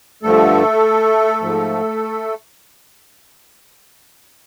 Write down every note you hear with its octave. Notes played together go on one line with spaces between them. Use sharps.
G2 D3 F3 A3 A4
G#2 F3